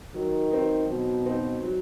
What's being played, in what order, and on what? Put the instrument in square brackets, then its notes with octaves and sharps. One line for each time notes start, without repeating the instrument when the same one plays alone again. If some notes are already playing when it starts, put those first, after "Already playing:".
[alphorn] D#3 [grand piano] F#3
[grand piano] C4 D#4
[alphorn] B2 [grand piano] F#3
[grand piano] C4 D#4
F#3